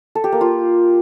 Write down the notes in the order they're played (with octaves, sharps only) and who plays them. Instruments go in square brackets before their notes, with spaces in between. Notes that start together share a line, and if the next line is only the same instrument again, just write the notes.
[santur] A4
G4
A#3
F4